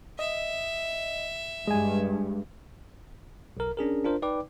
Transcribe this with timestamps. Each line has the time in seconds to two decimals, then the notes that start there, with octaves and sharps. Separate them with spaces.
0.19 D#5 E5
1.67 G2 G#3 D#5 G#5
3.57 B1 A#4
3.77 C#4 D4 G#4 A#4
4.04 D4 F4 A#4 C5
4.22 D#4 B4 D5 G5 D6